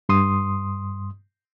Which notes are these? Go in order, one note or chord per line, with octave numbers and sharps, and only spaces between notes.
G2 C6 D#6